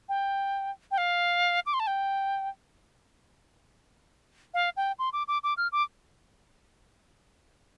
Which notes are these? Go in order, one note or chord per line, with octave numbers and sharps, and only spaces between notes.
G5
G5
F5
D6
C6
A5
G5
F5
G5
C6
D6
D6
D6
F6
D6